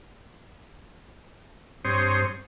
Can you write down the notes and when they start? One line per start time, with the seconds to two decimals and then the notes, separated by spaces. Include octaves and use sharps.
1.85 G2 C4 C5 C#5 D#6